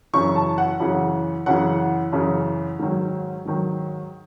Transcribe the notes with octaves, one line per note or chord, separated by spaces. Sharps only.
F#2 C#3 E3 C#6
A5
F#5
F#2 C#3 E3
F#2 C#3 E3 F#5
F#2 C#3 E3
G#2 D#3 F#3
G#2 D#3 F#3